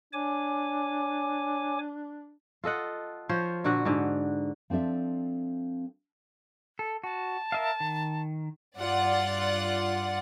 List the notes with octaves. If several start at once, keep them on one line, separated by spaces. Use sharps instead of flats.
D4 C#5 G#5 D6
F4 A4 D#5 F#5
F3 C5 C#5
A#2 D3 F#4 F#5
G#2 D3
F3 C4 D4 A4 E5
A4
F#4 A5
A#4 E5 F5
D#3
G2 F4 D5 F#5